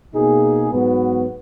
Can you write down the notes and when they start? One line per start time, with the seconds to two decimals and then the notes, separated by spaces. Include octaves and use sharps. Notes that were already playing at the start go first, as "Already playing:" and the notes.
0.14 B2 A#3 D#4 G#4
0.71 G#2 F#3 B3 F#4 B4